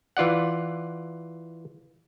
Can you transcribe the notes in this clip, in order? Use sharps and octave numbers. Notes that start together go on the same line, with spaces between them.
E3 F4 D5 F#5